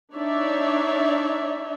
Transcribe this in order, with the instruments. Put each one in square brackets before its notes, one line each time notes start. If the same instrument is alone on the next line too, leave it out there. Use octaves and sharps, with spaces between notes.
[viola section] D4 D#4 C#5 D5 E5